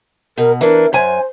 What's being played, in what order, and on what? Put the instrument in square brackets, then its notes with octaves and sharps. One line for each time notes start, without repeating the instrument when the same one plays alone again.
[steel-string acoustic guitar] B2 [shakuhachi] A#4
[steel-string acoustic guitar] E3 D4 [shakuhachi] A#4
[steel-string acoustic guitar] F#2 G#5 [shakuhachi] C5